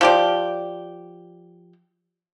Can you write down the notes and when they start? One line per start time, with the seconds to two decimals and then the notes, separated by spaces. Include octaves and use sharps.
0.01 F3 G4 D5